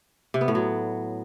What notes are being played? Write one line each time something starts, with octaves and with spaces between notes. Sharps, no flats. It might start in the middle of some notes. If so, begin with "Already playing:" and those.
C3
B3
A2
F#3